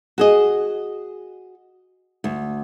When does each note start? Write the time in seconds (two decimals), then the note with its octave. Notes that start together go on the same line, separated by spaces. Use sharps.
0.18 F#4 G#4 D#5
2.24 D2